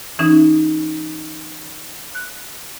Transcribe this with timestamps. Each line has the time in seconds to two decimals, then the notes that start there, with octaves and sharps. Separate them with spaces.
0.19 E3 C#4 D#4
2.15 F#6